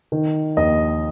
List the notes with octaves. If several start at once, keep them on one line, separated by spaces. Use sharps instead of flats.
D#3
D#2 D#5